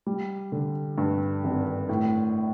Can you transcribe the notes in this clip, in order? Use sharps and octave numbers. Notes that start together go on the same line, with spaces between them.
G3
D3
G2
G#1
A2